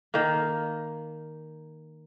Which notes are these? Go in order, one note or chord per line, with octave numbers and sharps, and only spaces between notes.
D#3 A#3